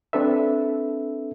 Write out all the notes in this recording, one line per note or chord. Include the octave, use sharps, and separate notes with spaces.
C4 D4 A4 B4 E5